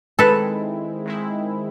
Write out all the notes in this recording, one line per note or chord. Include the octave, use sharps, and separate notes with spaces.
D#3 G#3 C4 E4 A4 B4
D#3 G#3 C4 E4